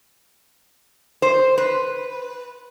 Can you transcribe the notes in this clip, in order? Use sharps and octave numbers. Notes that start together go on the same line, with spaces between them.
C5
B4